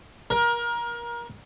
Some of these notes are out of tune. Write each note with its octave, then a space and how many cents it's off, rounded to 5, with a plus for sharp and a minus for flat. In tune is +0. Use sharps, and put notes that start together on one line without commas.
A#4 +25